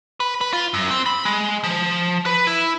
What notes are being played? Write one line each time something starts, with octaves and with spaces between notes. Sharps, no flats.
B4
B4
F4
F#2
C4
B5
G#3
F3
B4
E4